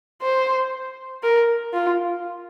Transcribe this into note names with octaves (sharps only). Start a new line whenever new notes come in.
C5
A#4
F4